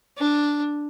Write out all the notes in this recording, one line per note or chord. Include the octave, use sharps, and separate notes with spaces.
D4